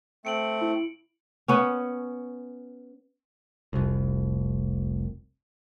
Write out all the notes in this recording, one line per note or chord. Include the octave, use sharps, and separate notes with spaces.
A3 C4 C#7 D7 F#7
E4
B3 C#4
F1 C2